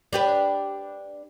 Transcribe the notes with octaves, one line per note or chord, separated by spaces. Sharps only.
D4 G4 B4